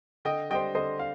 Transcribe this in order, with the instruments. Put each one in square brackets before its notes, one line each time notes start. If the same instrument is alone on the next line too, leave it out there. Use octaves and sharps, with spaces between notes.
[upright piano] D3 [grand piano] D#5 G5
[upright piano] G3 D4 G4 C5 [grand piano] D#5 G5
[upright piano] D3 [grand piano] C5 D#5
[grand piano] F5